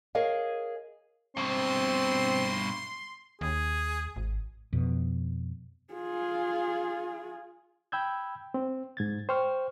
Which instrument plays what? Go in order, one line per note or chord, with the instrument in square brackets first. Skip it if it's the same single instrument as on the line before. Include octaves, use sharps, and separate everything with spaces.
[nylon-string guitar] G#4 A#4 C#5 D#5 F5 G#5
[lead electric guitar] G2 B2 [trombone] C4 [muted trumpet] C6
[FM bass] D#2 [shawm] G#4
[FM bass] G#1
[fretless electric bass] F2 B2
[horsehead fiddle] F4 G#4
[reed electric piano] G5 B5 E6 G6 G#6
C4
G#2 G#6 A6
C5 G5 C#6 F6